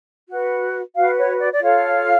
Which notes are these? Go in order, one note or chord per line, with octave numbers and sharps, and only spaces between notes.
F#4 B4
F#4 B4 F5
C#5
D5
D5
F4 A4 C#5 F5